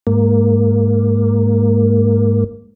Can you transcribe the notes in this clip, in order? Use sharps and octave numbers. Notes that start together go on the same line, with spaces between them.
G#2 A#3